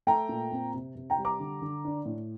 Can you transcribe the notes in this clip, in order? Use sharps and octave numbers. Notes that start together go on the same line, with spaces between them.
A3 G5 A#5
A#2
C4
C3
C3
G5 A#5
G3
A#5 D6
D3
D3
D4
A2